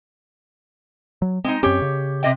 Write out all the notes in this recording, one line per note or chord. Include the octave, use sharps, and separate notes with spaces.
F#3
G#3 C4 D#4
F#2 C4 C#4 G4 C#5
C#3
C3 D#5 G5